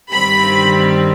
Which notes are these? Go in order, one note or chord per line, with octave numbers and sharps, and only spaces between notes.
G2 D#3 G3 C4 B5